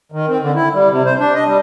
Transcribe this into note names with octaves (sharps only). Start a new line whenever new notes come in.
D#3
C4
D3
E4
G3
C3
C5
D4
D#5
G3